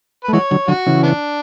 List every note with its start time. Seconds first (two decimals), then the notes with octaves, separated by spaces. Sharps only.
0.24 B4
0.29 A3
0.33 E3 G#3 F#4 C#5
0.51 D3 F#3
0.68 D3 F#3 F#4
0.87 C#3 E3
1.03 B3 D4